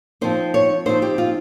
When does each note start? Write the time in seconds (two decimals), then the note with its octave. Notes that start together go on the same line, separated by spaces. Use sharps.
0.21 F3 C4 D#4 C5
0.54 C#5
0.86 F3 C4 D#4 C5
1.02 G4
1.18 F4